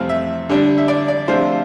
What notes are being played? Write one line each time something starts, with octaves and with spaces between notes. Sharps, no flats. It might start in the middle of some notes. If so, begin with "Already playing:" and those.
Already playing: F2 C3 E3 A3 C4 F5
E5
D3 G3 D4
E5
D5
D5
C3 F3 A3 D4 F4 C5